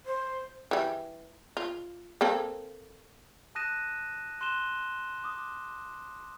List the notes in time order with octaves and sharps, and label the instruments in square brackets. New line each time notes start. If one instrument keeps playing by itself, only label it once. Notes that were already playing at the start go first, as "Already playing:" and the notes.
[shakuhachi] C5
[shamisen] E3 G3
F4
A#3 C4 A4
[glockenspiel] A5 D#6 F#6 A#6 D#7 E7
C6 F#6 D#7 E7 G7
D6 D#6